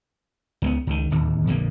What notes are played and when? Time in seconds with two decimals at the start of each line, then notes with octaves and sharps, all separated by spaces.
0.62 C#2 G3 B3
0.87 C#2 D#3
1.11 D1 D#2
1.47 A#1 F2 D3 A#3